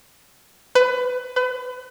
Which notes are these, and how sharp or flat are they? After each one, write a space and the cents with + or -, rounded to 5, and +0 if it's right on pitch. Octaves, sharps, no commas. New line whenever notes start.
B4 +25
B4 +35